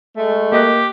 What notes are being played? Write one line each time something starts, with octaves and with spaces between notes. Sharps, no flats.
G#3 A3
A#3 G4 D#5 F#6